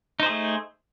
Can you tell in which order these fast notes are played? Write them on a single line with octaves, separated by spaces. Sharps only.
D#4 C5 G#4 A3